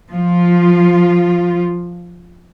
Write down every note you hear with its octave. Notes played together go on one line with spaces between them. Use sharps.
F3 F4